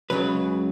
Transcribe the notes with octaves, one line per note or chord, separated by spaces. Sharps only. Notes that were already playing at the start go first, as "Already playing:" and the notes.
C#2 C#3 F#3 B4